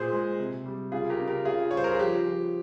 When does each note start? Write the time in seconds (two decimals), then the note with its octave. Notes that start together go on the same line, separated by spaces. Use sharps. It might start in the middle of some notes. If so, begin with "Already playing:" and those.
Already playing: A#2 G#4 C5
0.13 G#3
0.39 C3
0.66 G3
0.92 C#3 F4 G#4
1.10 G4 A#4
1.19 C#3
1.28 G4 A#4
1.45 C#3 F4 G#4
1.71 G3 C#5
1.77 C5
1.84 A#4
1.91 G#4
1.99 F3 G4
2.25 F3